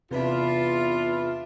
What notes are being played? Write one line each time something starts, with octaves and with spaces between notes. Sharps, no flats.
E2 C3 D4 F4 B4 E5 B5